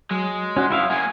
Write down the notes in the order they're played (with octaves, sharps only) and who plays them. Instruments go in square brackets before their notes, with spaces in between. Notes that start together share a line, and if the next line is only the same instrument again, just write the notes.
[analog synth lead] F#3 [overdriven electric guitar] G#3
[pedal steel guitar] C#4 F#4 [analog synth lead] C6
[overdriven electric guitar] B1 F#2 [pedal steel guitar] E4 E5 F5
[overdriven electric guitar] F#3 A#3 [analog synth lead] F#5 [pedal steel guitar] G#5